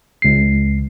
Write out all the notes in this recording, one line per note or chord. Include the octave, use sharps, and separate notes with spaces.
C#2 C7